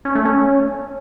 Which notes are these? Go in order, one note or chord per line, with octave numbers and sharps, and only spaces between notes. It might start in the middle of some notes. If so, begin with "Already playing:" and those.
C#4
A3
C#4